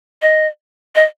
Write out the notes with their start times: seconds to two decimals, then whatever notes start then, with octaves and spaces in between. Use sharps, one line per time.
0.22 D#5
0.95 D#5